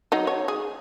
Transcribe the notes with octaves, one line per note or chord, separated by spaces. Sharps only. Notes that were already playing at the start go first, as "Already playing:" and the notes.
F#3 D#4
C#5
G#4